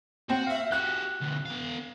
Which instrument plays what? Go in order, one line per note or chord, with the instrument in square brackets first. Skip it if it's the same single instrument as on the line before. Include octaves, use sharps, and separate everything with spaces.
[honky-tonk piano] C4 [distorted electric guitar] F#4 F#5
[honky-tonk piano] E5 F5
[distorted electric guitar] F#4 G4 [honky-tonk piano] F#6
[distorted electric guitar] D2 B2
B3 F5